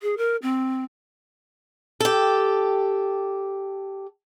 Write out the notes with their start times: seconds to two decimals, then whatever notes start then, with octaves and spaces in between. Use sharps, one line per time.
0.02 G#4
0.17 A#4
0.42 C4
2.00 G4 A4